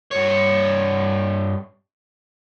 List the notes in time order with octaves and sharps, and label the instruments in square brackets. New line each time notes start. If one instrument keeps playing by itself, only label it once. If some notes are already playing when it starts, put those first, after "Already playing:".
[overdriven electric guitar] G2 C#5